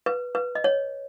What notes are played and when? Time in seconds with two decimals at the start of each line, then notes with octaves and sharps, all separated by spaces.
0.06 B4
0.35 B4
0.55 D#5
0.64 C#5